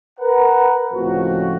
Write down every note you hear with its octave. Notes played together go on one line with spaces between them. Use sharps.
A#4 B4 F#5 A#5
C#2 A2 F3 C4 F#4